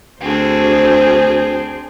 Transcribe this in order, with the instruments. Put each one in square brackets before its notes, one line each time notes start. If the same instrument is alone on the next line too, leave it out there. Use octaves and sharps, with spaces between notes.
[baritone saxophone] D2 [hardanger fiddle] C4 D4 [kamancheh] G#4 [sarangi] C5